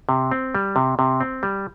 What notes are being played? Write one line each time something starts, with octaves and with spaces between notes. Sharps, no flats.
C3
C4
G3
C3
C3
C4
G3